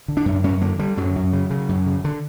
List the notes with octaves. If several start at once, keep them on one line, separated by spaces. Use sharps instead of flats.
D3
D4
F#2
F#2 C#4
D3 A#3
D3 G3
F#2 F#3
F#2
C#3
C#3
F#2
C#3
D3